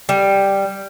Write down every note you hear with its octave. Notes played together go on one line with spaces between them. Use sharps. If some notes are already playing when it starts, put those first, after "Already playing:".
G3